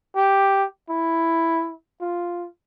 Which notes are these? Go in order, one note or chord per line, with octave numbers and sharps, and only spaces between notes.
G4
E4
F4